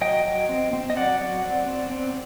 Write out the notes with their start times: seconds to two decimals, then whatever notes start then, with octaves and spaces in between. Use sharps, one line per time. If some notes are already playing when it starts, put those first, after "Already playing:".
0.01 F#3 D#5 G5
0.25 F#3
0.49 C4
0.73 C4
0.90 D#5
0.97 F#3 D5 F#5
1.20 F#3
1.45 C4
1.68 C4
1.91 C4